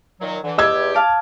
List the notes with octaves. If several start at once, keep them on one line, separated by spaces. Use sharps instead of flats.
A#2 D#3 F#3
D3 E3
E2 G4 D#5 E6 G#6
F5 A5 D6